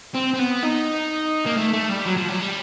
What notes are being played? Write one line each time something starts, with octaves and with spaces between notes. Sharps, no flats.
C4
C4
B3
D#4
A#3
A3
A3
G3
F#3
F3
F#3
G3